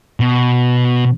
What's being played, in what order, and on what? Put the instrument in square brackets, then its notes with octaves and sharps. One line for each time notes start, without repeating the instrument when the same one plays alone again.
[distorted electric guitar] B2